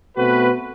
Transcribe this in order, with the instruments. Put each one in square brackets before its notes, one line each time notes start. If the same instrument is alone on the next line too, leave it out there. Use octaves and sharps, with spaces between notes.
[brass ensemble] B2 A3 C4 F#4 B4